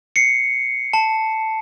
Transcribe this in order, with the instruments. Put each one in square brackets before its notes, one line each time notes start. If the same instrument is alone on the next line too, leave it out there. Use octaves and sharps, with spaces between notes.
[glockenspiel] C7 C#7
A5